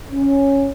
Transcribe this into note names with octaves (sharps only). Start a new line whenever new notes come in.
C#4